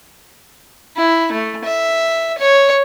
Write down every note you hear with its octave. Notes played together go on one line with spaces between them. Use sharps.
E4
A3
E5
C#5